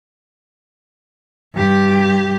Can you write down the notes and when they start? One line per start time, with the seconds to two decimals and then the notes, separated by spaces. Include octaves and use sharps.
1.54 G2 G4